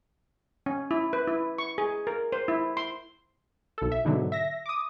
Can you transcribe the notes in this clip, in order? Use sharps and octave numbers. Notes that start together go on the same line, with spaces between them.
C#4
E4
B4
E4
C#6
G#4
A#4
C5
E4
C6
B1 A4
E5
G#2 B2 D3 F#3
E5 A#6
D6 D#6